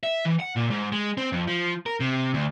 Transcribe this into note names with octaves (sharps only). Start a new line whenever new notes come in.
E5
E3
F#5
A#2
G#2
G#3
C4
F2
F3
A#4
C3
D2